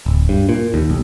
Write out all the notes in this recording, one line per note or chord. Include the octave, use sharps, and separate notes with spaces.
D1
G2
A#2
D#2
B1